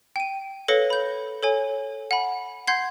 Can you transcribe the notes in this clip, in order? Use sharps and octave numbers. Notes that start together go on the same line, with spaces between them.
G5 D#7
A4 B4 C#5 F5 A#6 C#7
B5 G6
A4 C#5 G#5
F#5 G#5 B5
F#5 C6 G6 G#6 C7